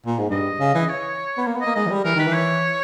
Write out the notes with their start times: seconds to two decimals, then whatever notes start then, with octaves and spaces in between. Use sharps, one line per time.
0.06 A#2
0.19 G#2
0.30 G2 D#5
0.60 C#3
0.74 E3
0.89 C#5
1.37 B3
1.47 A#3
1.56 B3
1.61 A#3 D#5
1.75 G#3 D#5
1.86 E3
1.90 G3
2.04 E3 A#4
2.16 D#3 B4
2.27 E3
2.33 C#5